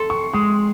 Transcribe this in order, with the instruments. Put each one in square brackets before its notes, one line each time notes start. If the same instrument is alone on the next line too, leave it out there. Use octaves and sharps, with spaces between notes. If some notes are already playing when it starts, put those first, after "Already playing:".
Already playing: [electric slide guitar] A4 [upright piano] C6
[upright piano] C#6
[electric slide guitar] G#3 [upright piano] D#6